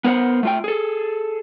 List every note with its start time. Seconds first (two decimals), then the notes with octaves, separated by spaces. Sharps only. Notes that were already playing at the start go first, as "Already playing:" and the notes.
0.04 B3 A#4 C5 F#5
0.43 A3 F4 G5
0.64 G#4 A4